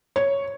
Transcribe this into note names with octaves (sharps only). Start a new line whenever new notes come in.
C#5